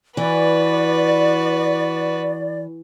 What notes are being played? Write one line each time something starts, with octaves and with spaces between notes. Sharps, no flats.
E3 F#4 B4 D5